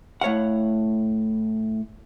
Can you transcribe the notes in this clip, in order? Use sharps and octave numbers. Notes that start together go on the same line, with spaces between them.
A2 C#5 F5 F#5